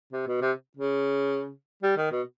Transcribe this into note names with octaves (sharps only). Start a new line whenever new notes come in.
C3
B2
C3
C#3
G3
D#3
B2